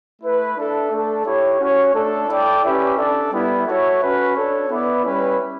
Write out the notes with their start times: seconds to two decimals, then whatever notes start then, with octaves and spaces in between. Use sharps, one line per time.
0.22 A3 E4 B4
0.57 D4 A4 E5
0.92 A3 D4 A4
1.25 E4 G4 C#5
1.60 C#4 F#4 C#5
1.94 A3 D4 A4
2.29 E4 A4 D5 G5
2.64 C#4 E4 G4 B4 E5
2.98 D4 A4 D5
3.33 G3 B3 E4
3.67 F#4 A4 C#5 E5
4.00 C#4 F#4 B4
4.35 D4 A4 C#5
4.69 B3 E4 B4 D5
5.05 G3 C#4 E4 B4